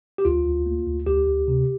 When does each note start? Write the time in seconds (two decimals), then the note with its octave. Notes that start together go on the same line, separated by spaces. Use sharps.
0.18 G4
0.25 D2 F4
0.46 D2
0.66 A#3
0.87 D2
1.06 D2 G4
1.27 D2
1.48 C3